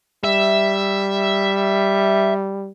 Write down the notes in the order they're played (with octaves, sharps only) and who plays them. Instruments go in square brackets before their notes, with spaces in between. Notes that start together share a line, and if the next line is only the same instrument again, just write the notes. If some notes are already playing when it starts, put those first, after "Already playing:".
[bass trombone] G3 [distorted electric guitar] E5